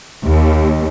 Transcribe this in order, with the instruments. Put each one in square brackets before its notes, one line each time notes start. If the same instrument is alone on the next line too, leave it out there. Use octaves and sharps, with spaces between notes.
[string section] D#2